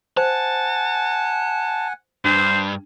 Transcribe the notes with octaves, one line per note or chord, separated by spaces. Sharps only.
C5 F#5 G#5 A5
G2 D4 C5